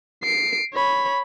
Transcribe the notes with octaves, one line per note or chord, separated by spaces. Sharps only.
C7 D7
C#5 B5